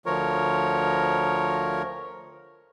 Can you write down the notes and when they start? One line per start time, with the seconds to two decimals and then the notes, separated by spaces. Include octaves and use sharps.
0.06 D2 F3 A#4 C#5